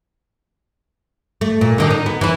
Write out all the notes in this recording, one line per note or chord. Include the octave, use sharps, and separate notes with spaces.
A3
A#2
D3 D#3 D4
D#4
B3
E3 E4